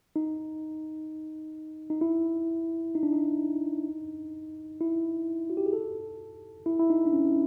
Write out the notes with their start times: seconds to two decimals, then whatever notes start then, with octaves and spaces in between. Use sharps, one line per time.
0.16 D#4
1.90 D#4
2.01 E4
2.95 D#4
3.03 D4
3.13 D#4
4.81 E4
5.50 F#4
5.57 G4
5.66 G#4
5.73 A4
6.66 E4
6.79 E4
6.90 D#4
7.06 D4
7.13 C#4